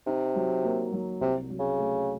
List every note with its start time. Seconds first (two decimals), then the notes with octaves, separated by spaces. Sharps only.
0.07 C3 D#4
0.35 F#3
0.64 A#3
0.92 F#3
1.21 C2 C3
1.50 F#3
1.60 C#3
1.79 A3